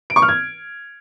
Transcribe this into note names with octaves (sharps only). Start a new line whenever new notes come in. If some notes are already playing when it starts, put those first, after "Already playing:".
D7
C#6
F6
G#6